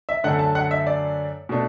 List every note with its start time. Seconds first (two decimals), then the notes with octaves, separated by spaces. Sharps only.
0.09 E5
0.24 F#2 D3 A3 D4 F#5
0.39 A5
0.55 F#5
0.71 E5
0.87 D5
1.49 B2 A3 D4